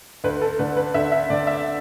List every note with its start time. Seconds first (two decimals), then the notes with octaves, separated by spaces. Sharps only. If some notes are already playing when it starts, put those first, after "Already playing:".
0.24 D2 B4
0.41 A4
0.59 D3 B4
0.77 B4
0.94 D2 E5
1.12 E5
1.30 D3 D5
1.47 E5